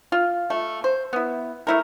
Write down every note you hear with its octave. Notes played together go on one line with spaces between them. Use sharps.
F4
A3
C5
B3 E4
A3 E4 A#4